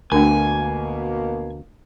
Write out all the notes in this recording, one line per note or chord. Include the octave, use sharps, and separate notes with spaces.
D2 B2 A3 A#3 D4 A#4 G#5